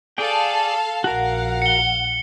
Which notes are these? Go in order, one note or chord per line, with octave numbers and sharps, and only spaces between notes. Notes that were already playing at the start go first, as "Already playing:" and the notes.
G#4 A4 D5 F5 G5 A5
A#1 F#4 A#4 F5 F#5
C#7 G7